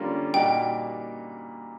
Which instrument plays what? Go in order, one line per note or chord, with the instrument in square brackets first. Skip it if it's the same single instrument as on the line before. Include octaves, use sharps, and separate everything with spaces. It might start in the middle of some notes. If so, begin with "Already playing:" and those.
Already playing: [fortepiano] D3 G3 A#3 C#4 F4
[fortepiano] A#2 G3 A#3 D#4 F#4 [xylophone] G5